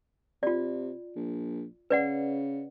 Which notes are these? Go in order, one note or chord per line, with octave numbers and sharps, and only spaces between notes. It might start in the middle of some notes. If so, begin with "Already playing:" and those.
C3 F4 D5
A#1
C#3 B4 D5 F#5